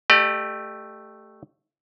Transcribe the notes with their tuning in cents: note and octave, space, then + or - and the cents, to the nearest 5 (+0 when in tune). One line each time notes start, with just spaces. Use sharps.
A3 +0 G4 +0 D5 +45